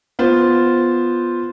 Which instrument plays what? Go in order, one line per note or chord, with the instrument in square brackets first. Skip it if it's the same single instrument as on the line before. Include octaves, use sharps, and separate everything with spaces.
[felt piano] B3 F4 C5